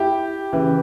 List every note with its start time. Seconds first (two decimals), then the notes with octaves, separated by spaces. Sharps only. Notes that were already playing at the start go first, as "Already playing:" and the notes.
Already playing: E4 G4
0.53 C#3 E3